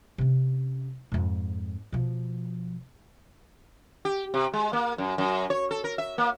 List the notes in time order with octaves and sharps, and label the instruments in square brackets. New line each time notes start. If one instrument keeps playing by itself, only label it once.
[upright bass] C3 C#4
F2 G#2
B2 F3
[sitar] G4
C3
G#3
A#3
F#2
F#2
C#5
A4
A#4
E5
A#3